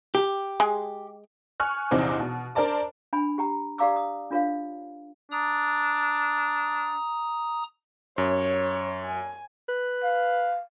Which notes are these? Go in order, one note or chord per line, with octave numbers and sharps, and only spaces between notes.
G4
G#3 G#4
G#5 C#6 F6 F#6
A#1 E2 C3 C4 D#4 D6
B2
D4 A#4 C5 D5 A5 D6
D4 G#5 B5
G4 G5 A#5
G4 D5 F5 A#5 D6 E6
D#6
D4 F4 A#4 C#5 F5
D4 A#5 D#6
F#2 C#5
G#5
B4
F5